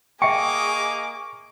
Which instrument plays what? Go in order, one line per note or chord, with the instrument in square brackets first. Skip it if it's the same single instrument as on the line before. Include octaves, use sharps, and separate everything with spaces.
[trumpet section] A#3 D#5 D6 [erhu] G#4 [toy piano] E5 G5 [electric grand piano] C#6 C#7